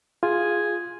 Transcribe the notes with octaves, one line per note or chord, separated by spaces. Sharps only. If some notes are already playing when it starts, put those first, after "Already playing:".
F4 G#4